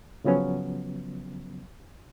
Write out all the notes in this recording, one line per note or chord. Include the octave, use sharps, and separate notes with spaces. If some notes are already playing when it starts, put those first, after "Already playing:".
C#3 F3 F#3 B3 C#4